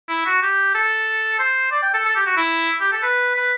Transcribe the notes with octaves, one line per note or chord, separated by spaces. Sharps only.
E4
F#4
G4
A4
C5
D5
G5
A4
A4
G4
F#4
E4
G4
A4
B4
B4